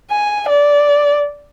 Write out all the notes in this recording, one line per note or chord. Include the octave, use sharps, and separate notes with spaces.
G#5
D5